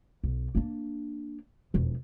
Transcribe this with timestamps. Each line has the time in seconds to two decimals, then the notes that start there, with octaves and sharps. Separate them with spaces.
0.24 B1
0.55 A#3 D4
1.74 E1 F2